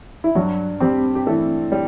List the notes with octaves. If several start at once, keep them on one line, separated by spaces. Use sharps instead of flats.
E4
G2 F#3 F#4
G3 C4 G4
G4
E3 A3 A4
G3